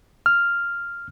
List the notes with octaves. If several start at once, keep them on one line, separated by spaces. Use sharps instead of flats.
F6